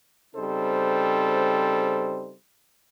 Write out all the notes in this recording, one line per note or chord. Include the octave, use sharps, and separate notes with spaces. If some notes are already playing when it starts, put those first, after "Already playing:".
C#3 G3 C4 D#4 A4 C5